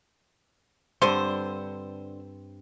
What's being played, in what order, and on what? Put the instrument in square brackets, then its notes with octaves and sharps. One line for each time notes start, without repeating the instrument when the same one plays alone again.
[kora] G2 C4 A4 [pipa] D3 C5